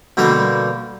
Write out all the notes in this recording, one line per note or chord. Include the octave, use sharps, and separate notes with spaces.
B2 D3 G3 A#3